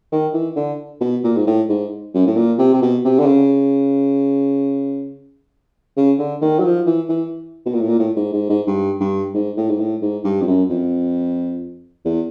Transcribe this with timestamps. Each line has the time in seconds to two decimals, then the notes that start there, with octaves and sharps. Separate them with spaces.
0.12 D#3
0.33 E3
0.56 D3
1.01 B2
1.24 A#2
1.36 G#2
1.47 A2
1.69 G#2
2.14 F#2
2.27 A2
2.37 A#2
2.58 C3
2.73 C3
2.82 B2
3.04 C3
3.19 D3
3.26 C#3
5.97 C#3
6.19 D3
6.41 D#3
6.59 F#3
6.65 F3
6.86 E3
7.09 E3
7.66 B2
7.74 A#2
7.81 A2
7.89 A#2
7.99 A2
8.16 G#2
8.33 G#2
8.49 G#2
8.67 G2
9.00 G2
9.34 G#2
9.57 A2
9.70 G#2
9.80 A2
10.02 G#2
10.24 G2
10.41 F2
10.47 F#2
10.70 F2
12.05 E2